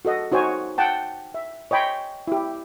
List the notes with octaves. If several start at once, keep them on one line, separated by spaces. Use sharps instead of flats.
F#4 A4 D#5 F#5
D#4 F#4 C5 C#5 G#5
F#5 G5 A5
E5
C#5 D#5 G5 B5 C6
E4 G4